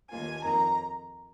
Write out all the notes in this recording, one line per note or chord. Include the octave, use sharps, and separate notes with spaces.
D#2 D#3 A#3 F4 G#5
F2 D#3 A#3 A#5